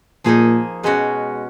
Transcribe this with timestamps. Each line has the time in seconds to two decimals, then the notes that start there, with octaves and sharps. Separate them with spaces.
0.24 A#2 F3 A#3 D#4 G#4
0.83 B2 G#3 C#4 F#4